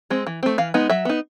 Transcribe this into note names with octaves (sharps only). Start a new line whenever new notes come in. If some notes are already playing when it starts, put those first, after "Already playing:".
G#3 C4
E3
A3 C4
E3 F5
G#3 B3 D#4
F#3 E5
B3 D#4